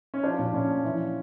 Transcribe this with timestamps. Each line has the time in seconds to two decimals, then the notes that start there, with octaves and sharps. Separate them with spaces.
0.14 C#4
0.23 F3 D4
0.39 A#2
0.54 A#2 C#4
0.69 F3
0.84 E3